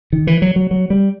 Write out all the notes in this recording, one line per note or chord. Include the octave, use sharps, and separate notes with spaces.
D#3
E3
F#3
F#3
F#3
G3